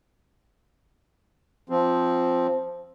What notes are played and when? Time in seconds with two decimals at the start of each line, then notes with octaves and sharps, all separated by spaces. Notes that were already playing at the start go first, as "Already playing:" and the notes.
1.69 F3 C4